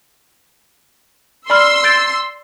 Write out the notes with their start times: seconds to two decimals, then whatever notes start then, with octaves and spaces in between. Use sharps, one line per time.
1.50 D5 B5 C6 E6 F6
1.84 G6 A6 D7